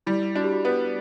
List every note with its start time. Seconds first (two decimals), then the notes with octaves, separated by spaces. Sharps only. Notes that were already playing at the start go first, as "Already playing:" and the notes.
0.06 G3 E4
0.35 D4 F#4
0.44 G4
0.52 F#4
0.65 B3